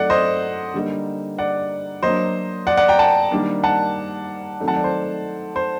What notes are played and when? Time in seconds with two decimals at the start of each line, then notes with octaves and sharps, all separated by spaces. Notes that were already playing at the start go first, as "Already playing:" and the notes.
Already playing: F#3 A3 D#4 D5 F#5
0.10 C5 D#5
0.74 D3 G3 A#3 D#4
1.38 D5 F#5
2.03 F#3 A#3 D4 C5 D#5
2.67 D5 F#5
2.77 D5 F#5
2.88 G5 A#5
2.99 F#5 A5
3.31 D#3 G3 A#3 D4
3.64 F#5 A5
4.59 D#3 F#3 A3 C4 D#4
4.68 F#5 A5
4.75 D5
4.84 C5
5.56 C5